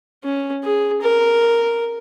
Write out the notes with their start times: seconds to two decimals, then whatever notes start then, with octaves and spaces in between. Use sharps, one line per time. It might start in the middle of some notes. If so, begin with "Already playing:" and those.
0.24 C#4
0.64 G#4
1.02 A#4